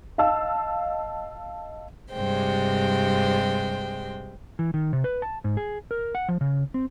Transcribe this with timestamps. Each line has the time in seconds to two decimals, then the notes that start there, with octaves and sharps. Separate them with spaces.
0.18 D#5 F5 A5 E6
2.12 G2 C3 G#3 C5 G5
4.59 E3
4.74 D#3
4.93 C3
5.04 B4
5.22 A5
5.44 G#2
5.57 G#4
5.91 A#4
6.15 F#5
6.28 F3
6.41 C#3
6.74 C4